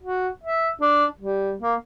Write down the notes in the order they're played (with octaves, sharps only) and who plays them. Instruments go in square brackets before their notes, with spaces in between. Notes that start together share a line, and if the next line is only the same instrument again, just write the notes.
[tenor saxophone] F#4
E5
D4
G3
A#3